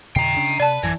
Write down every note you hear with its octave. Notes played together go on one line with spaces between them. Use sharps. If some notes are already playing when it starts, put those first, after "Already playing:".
F2 B2 D3 G5 A#5 C7
C#3 C#4 D4
C3 B4 D5 A5
A1 F#2 E3 G#6